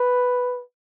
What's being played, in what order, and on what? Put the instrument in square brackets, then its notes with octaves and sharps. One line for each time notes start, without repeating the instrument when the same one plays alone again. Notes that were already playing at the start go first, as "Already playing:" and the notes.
Already playing: [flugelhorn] B4